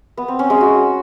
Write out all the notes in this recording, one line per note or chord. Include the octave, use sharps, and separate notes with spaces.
B3
C4
C#4
G#3
F#4